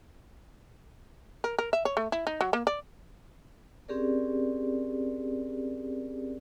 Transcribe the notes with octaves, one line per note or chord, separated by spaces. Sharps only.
A#4
A#4
E5
C#5
A3
E4
D#4
F#3
A#3
D5
C4 C#4 G4 G#4 A#4 D5